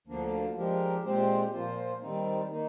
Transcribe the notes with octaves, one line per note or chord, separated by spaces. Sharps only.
D2 D3 F3 A#3 D4
F3 G#3 D4 G4 A#4
A#2 G#3 C4 G4 C5
A#2 F3 A#3 F4 C5
D#3 G3 C4 D#4
D#3 A#3 D#4